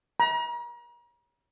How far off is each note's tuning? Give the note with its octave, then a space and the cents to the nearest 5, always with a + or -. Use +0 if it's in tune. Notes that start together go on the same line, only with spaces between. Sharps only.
A#5 +40